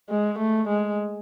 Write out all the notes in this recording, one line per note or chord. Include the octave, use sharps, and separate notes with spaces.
G#3
A3
G#3